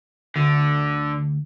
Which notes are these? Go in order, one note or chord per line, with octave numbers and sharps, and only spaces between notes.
D2 D3